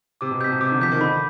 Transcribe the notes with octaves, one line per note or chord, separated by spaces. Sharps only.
C3 D6
B2
C3 G6 B6
B2
C3 D6
D3
F3 G6 B6
D#3
D3 B5